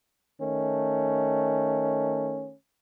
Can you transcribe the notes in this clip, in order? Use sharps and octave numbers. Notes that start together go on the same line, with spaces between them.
D#3 A3 C#4